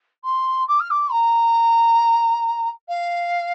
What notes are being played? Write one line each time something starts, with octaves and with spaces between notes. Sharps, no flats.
C6
D6
F6
D6
A#5
F5